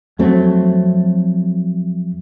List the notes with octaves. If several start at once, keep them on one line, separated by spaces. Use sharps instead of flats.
F2 F#3 A3 C4